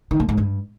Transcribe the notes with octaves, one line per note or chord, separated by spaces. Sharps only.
D#3
A2
G#2
G2